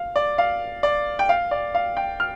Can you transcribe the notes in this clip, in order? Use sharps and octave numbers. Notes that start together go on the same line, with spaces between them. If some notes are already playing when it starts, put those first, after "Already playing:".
Already playing: F5
D5
F5
D5
G5
F5
D5
F5
G5
F6